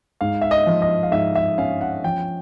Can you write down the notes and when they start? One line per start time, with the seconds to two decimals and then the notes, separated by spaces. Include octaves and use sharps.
0.21 G#2 F5
0.42 E5
0.51 D#5
0.67 F3
0.82 D#5
1.03 F5
1.12 G#2 E5
1.35 E5
1.58 C#4 F5
1.81 F#5
2.04 F3 G5